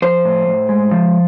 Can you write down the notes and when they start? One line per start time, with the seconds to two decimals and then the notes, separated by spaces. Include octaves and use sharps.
0.02 F3 C5
0.25 A2
0.48 A2
0.69 G#3
0.91 F3